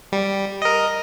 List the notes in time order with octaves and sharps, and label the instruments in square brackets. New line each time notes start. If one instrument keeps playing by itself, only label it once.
[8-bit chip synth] G3
A#4 D#5